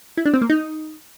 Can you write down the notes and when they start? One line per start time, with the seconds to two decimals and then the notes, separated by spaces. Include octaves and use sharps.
0.17 E4
0.25 D4
0.34 C4
0.42 A#3
0.50 D#4